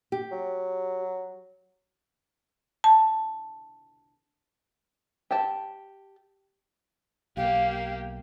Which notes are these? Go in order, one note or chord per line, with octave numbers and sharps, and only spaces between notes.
G4
F#3
A5
G4 G5 A5
B1 A#3 G4 F5